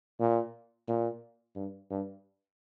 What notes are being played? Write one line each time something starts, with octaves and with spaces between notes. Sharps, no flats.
A#2
A#2
G2
G2